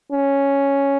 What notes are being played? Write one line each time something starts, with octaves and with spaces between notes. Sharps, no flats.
C#4